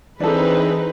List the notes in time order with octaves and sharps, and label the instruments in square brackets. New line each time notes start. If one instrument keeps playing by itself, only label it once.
[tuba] E3 [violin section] C4 D#4 B4 [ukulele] D4 A4 [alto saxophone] G#4